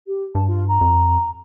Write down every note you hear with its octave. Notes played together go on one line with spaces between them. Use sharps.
G4
G2 A5
F4
A#5
F2